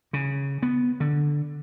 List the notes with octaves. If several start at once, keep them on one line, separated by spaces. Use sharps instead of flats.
C#3
B3
D3